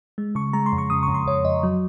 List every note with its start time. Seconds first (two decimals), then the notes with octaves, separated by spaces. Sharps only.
0.18 G#3
0.35 C#3 C#6
0.53 G#3 A#5
0.66 C6
0.72 F2
0.78 C#6
0.90 C#3 D#6
1.03 C#6
1.08 F2
1.14 C6
1.26 F2 C#5
1.45 F2 D#5
1.63 F#3